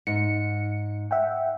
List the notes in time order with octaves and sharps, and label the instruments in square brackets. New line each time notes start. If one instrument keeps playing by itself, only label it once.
[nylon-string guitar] G#2 [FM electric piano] C#7
[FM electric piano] E5 F#5 G5